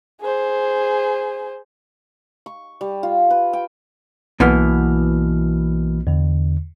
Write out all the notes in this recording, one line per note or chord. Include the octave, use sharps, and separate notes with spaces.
G#4 C5
C#6
G3
F4
B4
G5
B1 B2 E3 A#3 B3 F6
E2 D3